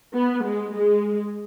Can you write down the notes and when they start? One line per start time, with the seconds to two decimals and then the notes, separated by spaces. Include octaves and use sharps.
0.14 B3
0.44 G#3
0.74 G#3